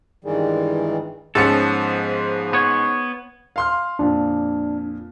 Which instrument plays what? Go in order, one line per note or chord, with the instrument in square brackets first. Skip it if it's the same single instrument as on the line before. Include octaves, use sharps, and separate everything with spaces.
[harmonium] G2 D#3 E3 G3 G#3
[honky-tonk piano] G#2 C#4 C#7 [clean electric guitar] F3 B3 A4
[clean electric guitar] B3 C#5
[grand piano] F5 C6 F6
[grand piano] F2 A#2 [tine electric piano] D4